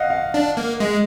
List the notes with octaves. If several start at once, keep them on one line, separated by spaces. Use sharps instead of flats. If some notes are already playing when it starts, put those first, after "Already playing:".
Already playing: D#5 F5 F#5
F5
D4
A#3
G#3 D#5